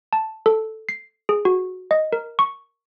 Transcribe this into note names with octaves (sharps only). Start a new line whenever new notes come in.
A5
A4
C7
G#4
F#4
D#5
A#4
C#6